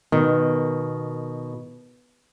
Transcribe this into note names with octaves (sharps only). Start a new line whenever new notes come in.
B2 D#3